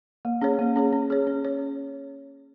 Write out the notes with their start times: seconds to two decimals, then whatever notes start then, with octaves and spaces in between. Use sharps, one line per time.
0.25 A#3
0.41 C#4 G#4 C#5
0.59 A#3
0.76 C#4 G#4 C#5
0.93 C#4
1.10 G#4 C#5
1.27 C#4
1.45 C#5